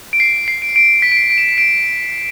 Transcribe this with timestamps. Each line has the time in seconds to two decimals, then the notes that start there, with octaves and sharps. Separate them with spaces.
0.13 D7
0.20 C7
0.48 C7
0.62 D7
0.76 D7
1.02 B6
1.12 D7
1.17 C7
1.30 D7
1.38 E7
1.44 D7
1.58 D7